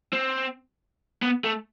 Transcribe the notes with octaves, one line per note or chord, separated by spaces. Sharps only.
C4
B3
A3